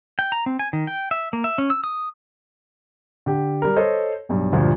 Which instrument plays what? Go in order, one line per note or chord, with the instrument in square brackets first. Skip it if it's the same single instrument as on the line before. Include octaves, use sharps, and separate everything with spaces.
[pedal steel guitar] G5
A#5
C4
G#5
D#3
G5
E5
A#3
E5
C#4
E6
D#6
[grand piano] D3 G4
G3 A#4
A4 C5 C#5 D#5
B1 G2
D2 G2 A#2 D3 F3